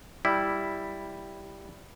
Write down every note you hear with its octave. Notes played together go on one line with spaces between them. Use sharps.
G3 E4